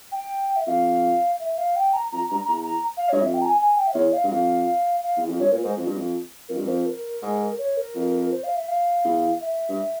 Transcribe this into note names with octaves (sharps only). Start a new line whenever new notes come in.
G5
E5
F2 F5
E5
F5
G5
A#5
F2 A#5
G2 A#5
E2 A#5
A#5
F5
G2 C#5
F2 E5
G5
A#5
G#5
G#5
G5
E5
E2 C#5
F5
G2
F2 F5
F5
E2
F2
G2 C#5
A#2 A#4
G#2 C5
F2
G2
F2
F2 A#4
G2
F2 C5
A#4
G#2
C#5
A#4
F2
C5
F5
E5
F5
E2
E5
G2